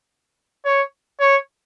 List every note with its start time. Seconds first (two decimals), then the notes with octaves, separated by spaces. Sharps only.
0.65 C#5
1.20 C#5